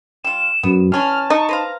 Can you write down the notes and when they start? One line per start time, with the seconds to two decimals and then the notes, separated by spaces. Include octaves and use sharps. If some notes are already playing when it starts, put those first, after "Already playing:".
0.24 G3 F4 E7
0.63 F#2 B3
0.92 E3 C#4 D4 A5 F6
1.30 D#4 C#6
1.49 B4 C5 F5 A#5